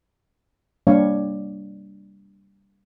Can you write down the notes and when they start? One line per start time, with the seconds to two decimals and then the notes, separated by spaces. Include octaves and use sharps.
0.87 G3 A#3 D4 C#5 F5